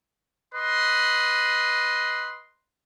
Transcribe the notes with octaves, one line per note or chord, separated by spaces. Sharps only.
B4 D#5 C6